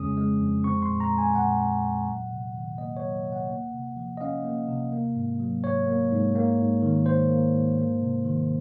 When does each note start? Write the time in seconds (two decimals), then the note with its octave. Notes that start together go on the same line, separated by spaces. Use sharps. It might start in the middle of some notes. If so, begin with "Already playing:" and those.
Already playing: F2 C#3 G#3 C#4 D#6
0.17 G#3
0.41 F2
0.64 C4 C#6
0.82 C6
0.88 A#2
1.00 A#5
1.12 G#3
1.18 G#5
1.35 A#2 F#5
1.60 C4
1.83 A#2
2.07 F#3
2.31 C3
2.54 D#3
2.78 A#3 D#5
2.97 C#5
3.02 F#3
3.27 C3
3.32 F#5
3.50 A#3
3.74 C3
3.97 F3
4.17 D#5
4.21 C#4 F5
4.44 A#3
4.68 C3
4.92 A#3
5.15 G#2
5.40 F#3
5.64 G#2 C#5
5.87 A#3
6.12 G#2
6.35 A#3
6.59 G#2
6.82 D#3
7.06 G#2 C5
7.30 A#3
7.54 G#2
7.78 A#3
8.02 C3
8.25 D#3